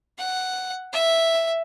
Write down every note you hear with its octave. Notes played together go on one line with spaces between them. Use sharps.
F#5
E5